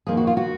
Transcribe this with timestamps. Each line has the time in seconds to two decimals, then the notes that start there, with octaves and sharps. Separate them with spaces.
0.07 F2 D#3 A#3 G#4
0.17 F#4
0.27 F4
0.37 F#4